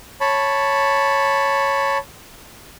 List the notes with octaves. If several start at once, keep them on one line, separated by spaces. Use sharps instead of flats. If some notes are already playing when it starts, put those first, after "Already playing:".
C#5 A5 B5